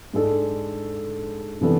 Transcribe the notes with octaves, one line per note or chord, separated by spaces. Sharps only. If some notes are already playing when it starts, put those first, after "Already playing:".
G#2 G#3 D4 A4
C3 E3 B3 D4 A4